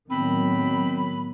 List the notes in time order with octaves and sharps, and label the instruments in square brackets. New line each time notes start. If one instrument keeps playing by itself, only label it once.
[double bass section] A2 D#3 F#3 [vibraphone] B3 [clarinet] C4 [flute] B5